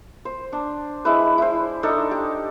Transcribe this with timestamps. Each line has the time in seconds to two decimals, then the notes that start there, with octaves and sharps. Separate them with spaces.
0.25 C5
0.53 D4
1.05 G#3 E4 B4
1.38 E4 C5
1.83 D4 D#4 A4 D#5
2.11 G4